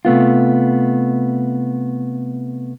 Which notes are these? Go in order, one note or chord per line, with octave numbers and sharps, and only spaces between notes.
C3 A3 B3 F4